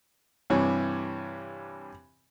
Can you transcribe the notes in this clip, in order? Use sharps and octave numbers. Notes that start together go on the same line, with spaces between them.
G2 C3 E3 C#5